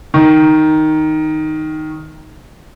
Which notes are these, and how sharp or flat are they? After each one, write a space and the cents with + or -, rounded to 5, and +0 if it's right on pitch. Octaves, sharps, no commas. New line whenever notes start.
D#3 +0